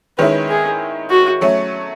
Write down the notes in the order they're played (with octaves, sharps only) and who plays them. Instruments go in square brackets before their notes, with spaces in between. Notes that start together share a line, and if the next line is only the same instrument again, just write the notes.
[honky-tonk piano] D#3 G#3 C#4 E4 [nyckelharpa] B4
[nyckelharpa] G#4
F#4
[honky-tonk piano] F#3 A3 C#4